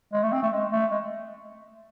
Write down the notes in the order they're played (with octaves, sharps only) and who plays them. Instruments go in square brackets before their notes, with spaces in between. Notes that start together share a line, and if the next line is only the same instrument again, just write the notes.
[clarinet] G#3
A3
C4
A3
G#3
A3
G#3